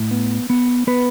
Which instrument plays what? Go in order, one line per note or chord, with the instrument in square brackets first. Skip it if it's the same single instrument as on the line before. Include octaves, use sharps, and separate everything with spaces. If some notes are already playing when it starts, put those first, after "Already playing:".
Already playing: [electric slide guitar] A2
B3
B3
B3 B4